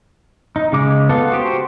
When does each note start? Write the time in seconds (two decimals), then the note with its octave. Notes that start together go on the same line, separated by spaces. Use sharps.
0.56 D#4
0.72 C#3 G#3 D6
1.09 B3 F4 A4
1.31 F#4 G4 C5